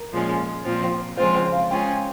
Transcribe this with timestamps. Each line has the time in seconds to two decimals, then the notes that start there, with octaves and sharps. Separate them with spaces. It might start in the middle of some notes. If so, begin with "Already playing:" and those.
Already playing: A#4
0.12 A#2 F3 G#3 C#4
0.65 A#2 F3 C4 F4
1.17 C#3 F3 G#3 C4 F4 C5
1.35 C5
1.52 F5
1.70 G#3 C#4 F4 G#4 G5